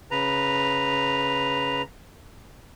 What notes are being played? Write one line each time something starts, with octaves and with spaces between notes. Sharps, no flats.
C#3 B4 A#5